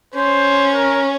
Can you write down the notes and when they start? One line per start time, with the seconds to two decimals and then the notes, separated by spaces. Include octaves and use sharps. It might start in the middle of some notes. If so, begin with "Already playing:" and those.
0.14 C#4 C5
0.73 A#4